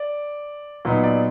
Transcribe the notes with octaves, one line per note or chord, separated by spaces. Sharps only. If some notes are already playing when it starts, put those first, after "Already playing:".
Already playing: D5
A#2 F#3 B3 D#4
D5